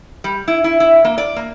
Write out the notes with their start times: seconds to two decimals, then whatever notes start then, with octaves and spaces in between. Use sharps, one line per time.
0.24 G3
0.48 E4
0.64 E4
0.80 E4
1.05 A#3
1.18 D5
1.36 A#3